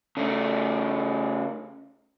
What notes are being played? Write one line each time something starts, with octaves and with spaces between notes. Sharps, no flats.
C#3 A3